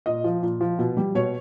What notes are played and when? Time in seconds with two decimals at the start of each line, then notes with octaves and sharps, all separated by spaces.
0.06 A#2 D#5
0.24 F3
0.43 A#2
0.61 F3
0.79 B2
0.97 G3
1.15 B2 C#5